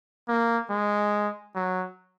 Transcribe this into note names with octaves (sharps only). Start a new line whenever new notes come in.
A#3
G#3
F#3